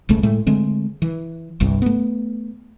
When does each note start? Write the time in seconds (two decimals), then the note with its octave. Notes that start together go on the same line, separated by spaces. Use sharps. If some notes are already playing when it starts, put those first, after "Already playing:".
0.09 E1 C#2 C#3 A3
0.23 A2 G#3 A3
0.47 D3 G#3 A3 C4
1.02 E3
1.60 G1 C2 G2
1.82 A3 B3